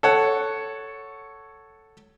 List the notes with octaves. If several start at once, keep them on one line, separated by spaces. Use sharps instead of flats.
A4 C#5 F#5